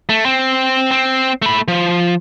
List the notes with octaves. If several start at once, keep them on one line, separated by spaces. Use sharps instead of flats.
A3
C4
C4
A3 B5
F3